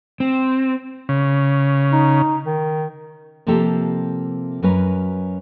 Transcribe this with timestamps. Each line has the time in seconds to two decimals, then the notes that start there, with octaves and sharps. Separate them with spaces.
0.20 C4
1.09 C#3
1.92 D#4
2.46 D#3
3.47 C3 F3 A#3 C4 G4 A4
4.62 F#2 F#3 C#4 A#4 B4 G#5